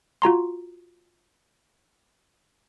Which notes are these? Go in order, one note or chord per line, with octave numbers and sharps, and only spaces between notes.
F4 F#4 A#5 C6